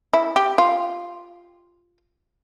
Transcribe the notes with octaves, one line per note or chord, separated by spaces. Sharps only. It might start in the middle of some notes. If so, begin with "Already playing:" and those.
E4
G4
F4